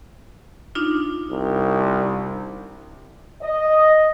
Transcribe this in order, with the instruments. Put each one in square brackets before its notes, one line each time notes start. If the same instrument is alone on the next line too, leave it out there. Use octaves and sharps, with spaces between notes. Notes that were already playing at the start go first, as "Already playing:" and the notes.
[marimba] D4 D#4 F4
[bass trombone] C2
[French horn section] D#5